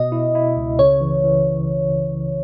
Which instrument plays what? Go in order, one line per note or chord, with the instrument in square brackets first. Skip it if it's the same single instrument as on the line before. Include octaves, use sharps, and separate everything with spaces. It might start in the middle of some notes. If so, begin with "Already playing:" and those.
Already playing: [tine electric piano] B2 [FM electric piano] D#5
[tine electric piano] E4
E4
C#2
[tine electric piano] C#3 [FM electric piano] C#5
[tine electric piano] E3
E3